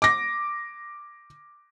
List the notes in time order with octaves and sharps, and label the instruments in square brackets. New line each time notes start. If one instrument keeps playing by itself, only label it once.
[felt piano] D6 A#6